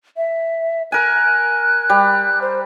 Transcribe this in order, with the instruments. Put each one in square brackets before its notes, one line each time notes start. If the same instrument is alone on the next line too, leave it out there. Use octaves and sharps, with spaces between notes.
[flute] E5
[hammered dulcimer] A#4 G#5 [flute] F#6
[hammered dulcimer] G3
[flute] C5